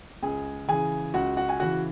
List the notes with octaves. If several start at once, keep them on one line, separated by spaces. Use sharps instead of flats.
C#2 G#4 G#5
C#3 E3 G#4 G#5
C#2 F#4 F#5
F#4 F#5
G#5
C#3 E3 F#4 F#5